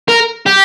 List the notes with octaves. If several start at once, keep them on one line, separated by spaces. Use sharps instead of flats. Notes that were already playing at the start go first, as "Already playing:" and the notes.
A#4
G4